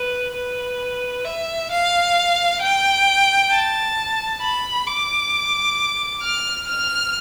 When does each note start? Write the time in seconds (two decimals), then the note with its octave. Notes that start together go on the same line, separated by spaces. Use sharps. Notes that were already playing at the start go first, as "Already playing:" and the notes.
Already playing: B4
0.35 B4
1.25 E5
1.71 F5
2.61 G5
3.51 A5
4.41 B5
4.87 D6
6.22 F6
6.67 F6